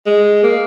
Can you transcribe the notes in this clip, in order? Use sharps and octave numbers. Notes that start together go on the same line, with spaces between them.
G#3
A#3